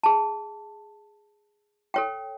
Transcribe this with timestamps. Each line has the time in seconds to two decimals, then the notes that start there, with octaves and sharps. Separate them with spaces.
0.03 G#4 A5
1.94 A4 C#5 G5